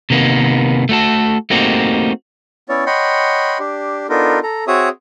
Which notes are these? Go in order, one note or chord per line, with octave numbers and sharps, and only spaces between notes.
C3 D#3 A#3 B3
A3 F#4 A4
A3 A#3 C4 D#4 F#4 G4
B3 C#4 E4 C#5 D5
C#5 D#5 F#5 G5 B5 C6
D4 G4
B3 D4 D#4 F4 A4 A#4
A4 A#5
C4 F#4 G#4 C#5 E5 D#6